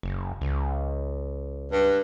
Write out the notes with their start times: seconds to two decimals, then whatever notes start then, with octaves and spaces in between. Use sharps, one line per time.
0.03 F#1
0.41 C#2
1.72 G2